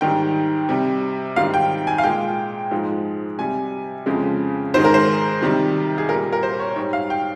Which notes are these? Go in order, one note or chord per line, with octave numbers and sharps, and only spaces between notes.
G#2 D#3 G3 G5
C3 G3
G#2 D#3 G3 F5
G5
G#5
F5
A#2 G#3 G5
G#2 F3 G#3
C3 G3 G#5
F2 C#3 F3 G#3
G#2 D#3 G#3 C5
A#4
C5
C3 D#3 G3
G#4
A#2 G3 A#4
A#4
C5
C#5
G#2 G3 C#5
F5
G5